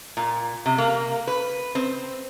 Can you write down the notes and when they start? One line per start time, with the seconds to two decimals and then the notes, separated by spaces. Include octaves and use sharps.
0.17 A#2
0.66 C3
0.78 A#3
1.27 B4
1.75 C4